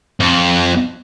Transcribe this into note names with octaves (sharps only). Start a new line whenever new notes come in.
F2